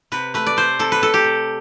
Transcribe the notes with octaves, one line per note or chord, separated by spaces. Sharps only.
C3 B4
A3 B4
D5
A3 C5
C3 A4
B4
C3 A4
G4
C3